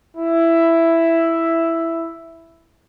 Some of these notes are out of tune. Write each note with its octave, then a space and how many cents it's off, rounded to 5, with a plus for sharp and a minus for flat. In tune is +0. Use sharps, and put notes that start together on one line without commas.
E4 +5